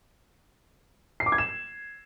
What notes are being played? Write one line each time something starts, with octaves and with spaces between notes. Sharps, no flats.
C7
D6
G#6
E7